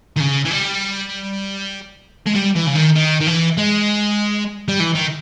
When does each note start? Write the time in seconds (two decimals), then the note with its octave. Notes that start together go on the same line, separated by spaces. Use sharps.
0.16 D#3
0.20 C#3
0.45 E3
0.51 G3
2.26 G#3
2.35 G3
2.55 E3
2.66 C#3
2.75 D#3
2.95 D#3
3.21 D#3
3.27 E3
3.57 G#3
4.68 G3
4.80 E3
4.95 D#3